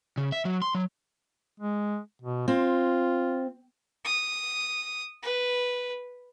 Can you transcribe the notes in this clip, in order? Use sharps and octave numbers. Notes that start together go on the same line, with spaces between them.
C#3
E5
F#3
C6
F#3
G#3
B2
C4 F4
D#6
B4